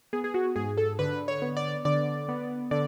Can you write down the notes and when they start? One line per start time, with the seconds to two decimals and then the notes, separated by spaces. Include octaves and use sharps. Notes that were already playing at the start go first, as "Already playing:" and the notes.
0.13 B3 G#4
0.24 G#4
0.34 F#4
0.56 G#2 G#4
0.78 A4
0.99 D3 B4
1.28 C#5
1.42 B3
1.57 D5
1.85 D3 D5
2.29 B3
2.71 D3 D5